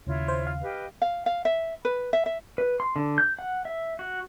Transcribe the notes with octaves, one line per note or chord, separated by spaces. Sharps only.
D#2 C#3 E4 F4 C#5
C5
F5
G4 B4 D#5
F5
F5
E5
B4
E5
E5
B4
C6
D3
G6
F#5
E5
F#4